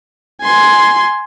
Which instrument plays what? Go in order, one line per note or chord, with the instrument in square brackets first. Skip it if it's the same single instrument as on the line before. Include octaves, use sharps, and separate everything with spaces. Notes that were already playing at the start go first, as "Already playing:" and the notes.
[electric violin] G#5 C6